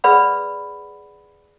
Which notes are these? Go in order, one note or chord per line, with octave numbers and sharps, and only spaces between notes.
G#4 B4 D5 F#5 B5 E6